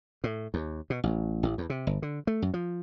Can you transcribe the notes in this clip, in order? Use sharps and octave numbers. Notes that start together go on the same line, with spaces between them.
A2
D#2
B2
A1
A1
E2
C3
G1
D3
A3
F#2
F3